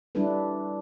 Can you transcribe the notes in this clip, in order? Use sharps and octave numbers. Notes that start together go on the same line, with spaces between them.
G3 D4 E4 A4 B4